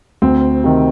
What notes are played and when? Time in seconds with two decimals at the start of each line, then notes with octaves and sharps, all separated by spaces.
0.22 D2 C4
0.64 C3 D#3